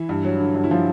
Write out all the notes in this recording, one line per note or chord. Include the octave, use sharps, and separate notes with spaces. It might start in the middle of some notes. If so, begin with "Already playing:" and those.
Already playing: E3 E4
G2
F#3
D3
G2
E4
F3 F4